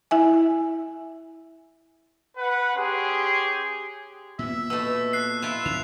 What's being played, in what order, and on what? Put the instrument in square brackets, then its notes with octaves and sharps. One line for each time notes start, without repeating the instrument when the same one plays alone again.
[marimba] E4 E5 G#5
[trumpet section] B4 F#5
C#4 G4 G#4 C6
[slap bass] A#2 B3 [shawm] E5
[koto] B2 A3 [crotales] E6
[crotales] F#6 C7
[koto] E4 F4 [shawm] E5 [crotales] E7
[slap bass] E2 C#3 F3 [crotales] F7